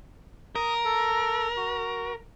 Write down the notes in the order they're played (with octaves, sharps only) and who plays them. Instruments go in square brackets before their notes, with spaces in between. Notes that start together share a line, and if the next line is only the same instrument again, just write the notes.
[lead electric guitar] A#4 [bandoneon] D#6
[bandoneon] A4
F#4